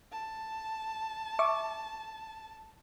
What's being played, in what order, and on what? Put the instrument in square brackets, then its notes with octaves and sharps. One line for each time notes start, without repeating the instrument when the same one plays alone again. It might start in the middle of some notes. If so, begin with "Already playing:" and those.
[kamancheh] A5
[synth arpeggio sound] E5 C#6 D6